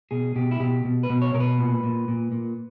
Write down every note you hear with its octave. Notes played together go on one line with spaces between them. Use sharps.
B2 G#4
B2 G4
E4
B2 G4
B2
B4
B2
C#5
B2 A#4
B4
A#2
A#2
A#2
A#2